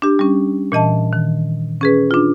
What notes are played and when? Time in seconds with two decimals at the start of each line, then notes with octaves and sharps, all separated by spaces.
0.02 D4 G4
0.19 G3 C#4
0.72 A#2 E3 D#5 A5
1.13 D#3
1.81 C#4 G#4 B4
2.11 D4 F4